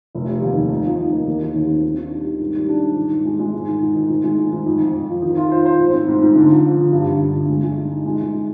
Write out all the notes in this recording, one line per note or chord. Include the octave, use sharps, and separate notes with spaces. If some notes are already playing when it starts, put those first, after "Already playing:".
F1
G3
D#2
F1
D#4
F3
F3
A#3
D#2
D#3
D#2
C4
D#3
D4
G3
D#3
G#2
G3
D4
G#2
D#3
G#2
G#3
G#3
G#2
D#3
G#2
D#3
G#2
G#3
D#3
G#2
F2
F2
F2
F3
D#3
F4
C5
C5
G#2
C4
G#2
G#2
D3
F3
F3
D3
G2
D3
G2
D3
G#3
G#3
D#4
D#4
G#3
G#3
G#3